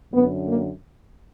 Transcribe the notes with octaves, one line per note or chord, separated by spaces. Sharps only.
F#2 D3 B3
A#3